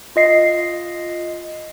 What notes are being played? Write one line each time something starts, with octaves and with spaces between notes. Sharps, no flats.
F4 D#5 C7